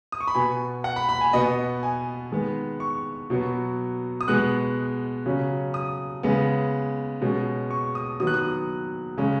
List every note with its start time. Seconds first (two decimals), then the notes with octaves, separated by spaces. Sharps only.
0.12 D#6
0.20 C#6
0.28 B5
0.35 B2 B3 G#5
0.84 F#5
0.96 B5
1.09 B5
1.21 G#5
1.33 B2 B3 D#5
1.83 G#5
2.31 D#3 G#3 B3
2.80 C#6
3.30 B2 F#3 B3
4.21 D#6
4.28 B2 G#3 B3 F#6
5.26 C#3 F#3 C#4
5.74 D#6
6.23 C#3 G#3 B3
7.22 B2 G#3 C#4
7.71 C#6
7.95 D#6
8.20 D#3 F#3 B3 D#6
8.27 F#6
8.34 D#6
9.17 C#3 G#3 C#4